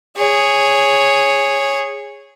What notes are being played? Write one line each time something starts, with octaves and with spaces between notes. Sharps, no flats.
G#4 C#5